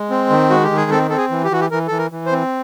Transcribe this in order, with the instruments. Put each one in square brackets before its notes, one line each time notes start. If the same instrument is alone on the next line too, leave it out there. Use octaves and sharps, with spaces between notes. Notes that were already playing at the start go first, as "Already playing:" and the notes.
Already playing: [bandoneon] G#3
C4
D#3
G#3 F#4
G4
D#3
G#4
C4 A4
C4 A4
G#4
E3
G4
E3 F#4
G4
E3 A#4
E3 A4
A#4
E3
C5
C4